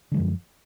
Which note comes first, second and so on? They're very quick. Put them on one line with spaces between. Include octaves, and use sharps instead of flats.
D3 G#3 F3 F#2